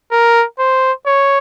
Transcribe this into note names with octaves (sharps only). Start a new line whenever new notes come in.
A#4
C5
C#5